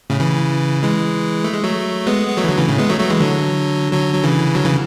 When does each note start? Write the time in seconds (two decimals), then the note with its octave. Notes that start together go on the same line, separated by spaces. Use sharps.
0.10 A2 C#3
0.20 C#3 E3
0.82 E3 G#3
1.44 A3
1.54 G#3
1.63 F#3 A3
2.07 G#3 B3
2.27 B3
2.37 F#3 A3
2.44 E3
2.48 D3 F#3
2.58 C#3 E3
2.69 A2 C#3
2.78 G#3 B3
2.89 F#3 A3
3.00 F#3 A3
3.10 E3 G#3
3.20 D3 F#3
3.92 D3 F#3
4.14 F#3
4.24 C#3 E3
4.55 D3 F#3
4.65 C#3 E3